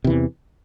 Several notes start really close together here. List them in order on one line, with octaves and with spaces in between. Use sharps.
C3 E3 E2